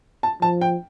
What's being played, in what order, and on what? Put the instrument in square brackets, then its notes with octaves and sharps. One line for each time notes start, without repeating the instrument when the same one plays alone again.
[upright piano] A5
[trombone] F3 [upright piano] A5
[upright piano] G5